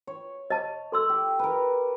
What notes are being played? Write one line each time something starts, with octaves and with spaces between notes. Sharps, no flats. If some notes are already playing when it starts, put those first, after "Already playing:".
C#5
D#5 A5
A4 C6 E6
G4
A#4 B4